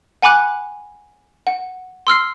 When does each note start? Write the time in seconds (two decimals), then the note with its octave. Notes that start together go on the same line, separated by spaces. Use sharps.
0.22 F#5 G#5 B5 D6 F#6
1.47 F#5
2.07 C6 E6 F6 C7